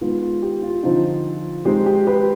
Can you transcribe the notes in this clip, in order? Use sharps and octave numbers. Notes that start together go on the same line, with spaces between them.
D#3 G#3 B3 F4
F4
G4
F4
D3 F3 C4 D#4 F4
D#3 G#3 C4 D#4 G4
G4
G4 B4